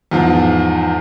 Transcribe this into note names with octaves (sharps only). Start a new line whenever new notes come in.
E2 G#2 F3